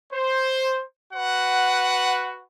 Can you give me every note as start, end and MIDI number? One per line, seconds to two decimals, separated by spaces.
0.13 0.82 72
1.14 2.42 66
1.14 2.42 71
1.14 2.42 78